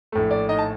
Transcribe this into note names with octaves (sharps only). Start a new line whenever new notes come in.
A#1 A2 A3
D5
D#4 D#5
A5